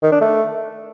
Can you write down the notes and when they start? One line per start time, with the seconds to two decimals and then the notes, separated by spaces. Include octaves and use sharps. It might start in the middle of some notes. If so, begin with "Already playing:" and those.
0.03 D#3
0.12 D4
0.21 A3